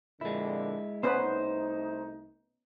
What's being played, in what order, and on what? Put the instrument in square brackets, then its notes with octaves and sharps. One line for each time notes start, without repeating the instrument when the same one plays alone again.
[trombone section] F2 A#2 D3 [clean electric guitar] G#3 E4
[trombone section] C2 A3 D#4 [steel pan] B3 C#4 B4 [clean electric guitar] C5